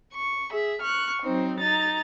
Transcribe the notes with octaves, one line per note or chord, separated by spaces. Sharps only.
C#6
G#4 E5
C#6 F6 F#6
F#3 C4 D#4 C5
D#4 A#5 A6